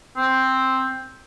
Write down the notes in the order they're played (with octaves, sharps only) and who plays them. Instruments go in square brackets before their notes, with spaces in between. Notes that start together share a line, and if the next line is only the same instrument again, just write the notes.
[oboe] C4